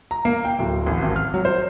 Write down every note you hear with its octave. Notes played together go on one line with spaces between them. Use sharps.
A#5
A#3
G5
D1
A1
G#1
F6
F#3
C5